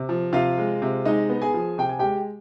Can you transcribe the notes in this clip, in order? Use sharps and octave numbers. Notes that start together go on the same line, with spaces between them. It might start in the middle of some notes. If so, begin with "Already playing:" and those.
Already playing: C3
F3
C3 F4 F5
G#3
C3
G#3 D#4 D#5
B3
G#4 G#5
F3
C3 G5
G#5
G#3 G4 G5